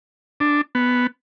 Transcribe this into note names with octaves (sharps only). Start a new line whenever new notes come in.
D4
B3